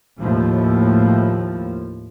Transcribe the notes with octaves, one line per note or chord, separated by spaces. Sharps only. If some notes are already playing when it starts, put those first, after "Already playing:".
D#2 A2 F3